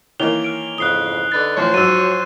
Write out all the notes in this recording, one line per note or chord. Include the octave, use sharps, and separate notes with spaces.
D#3 E3 A#3 C#5 F7 G7
F6 D7
F2 G#2 C#3 D#6 F#6 C7 G7
D3 D#4 B4 A6
A2 E3 F3 C5 C#5
G#2 F3 F#3 F#4 E6 A6 D#7